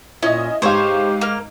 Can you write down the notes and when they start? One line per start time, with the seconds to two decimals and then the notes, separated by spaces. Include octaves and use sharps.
0.23 A#2 C#4 E4 D#5
0.62 G#2 G4 C5 C#5 F5
1.21 A#3 F6